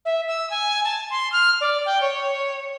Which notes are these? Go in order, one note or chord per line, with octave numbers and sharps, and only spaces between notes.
E5
E6
G#5
A5
C6
F6
D5
G5
C#5